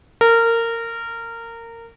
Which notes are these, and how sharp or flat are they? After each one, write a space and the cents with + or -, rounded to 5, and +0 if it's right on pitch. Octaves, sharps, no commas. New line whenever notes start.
A#4 -20